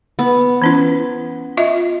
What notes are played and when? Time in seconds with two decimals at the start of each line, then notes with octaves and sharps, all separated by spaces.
0.19 B3
0.62 E3 C#4 E4
1.57 F4 D#5 E5